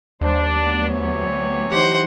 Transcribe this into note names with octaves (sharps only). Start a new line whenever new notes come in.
D#2 G3 D4 C5
D2 F#3 B3
E2 C3 C#5
E3 F#3 D#4 G4 C5 F#5